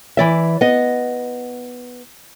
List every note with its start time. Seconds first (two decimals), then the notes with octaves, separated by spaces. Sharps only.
0.17 E3 D5 E5
0.61 B3 D#5